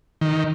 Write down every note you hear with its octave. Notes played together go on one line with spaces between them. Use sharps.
D#3